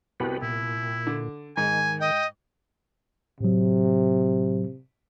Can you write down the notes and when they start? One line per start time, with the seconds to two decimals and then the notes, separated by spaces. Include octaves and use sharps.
0.20 C2 B3 C4 F#4 G4 B4
0.42 A#2 E4
1.07 D3
1.57 G#2 D#3 G#5
2.01 D#5 G5
3.41 A2 C3 F#3